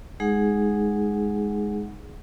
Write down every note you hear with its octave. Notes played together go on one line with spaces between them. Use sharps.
G#3 D#4 G#4 F#5